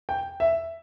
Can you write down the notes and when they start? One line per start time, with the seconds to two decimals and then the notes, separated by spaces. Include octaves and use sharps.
0.09 G5
0.40 E5